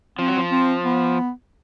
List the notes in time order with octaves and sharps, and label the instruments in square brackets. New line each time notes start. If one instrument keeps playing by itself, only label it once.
[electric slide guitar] F3 [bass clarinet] C4
[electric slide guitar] F#3
F3
[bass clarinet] C4
B3